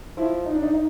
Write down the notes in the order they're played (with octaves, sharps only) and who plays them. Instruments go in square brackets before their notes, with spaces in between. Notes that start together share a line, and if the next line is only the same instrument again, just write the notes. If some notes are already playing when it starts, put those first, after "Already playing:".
[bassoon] F3 [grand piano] E4
[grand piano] D#4
D4
D#4
D#4